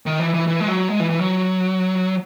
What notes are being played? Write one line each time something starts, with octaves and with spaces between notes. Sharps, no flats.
D#3
E3
E3
E3
G#3
F#3
G#3
E3
E3
F#3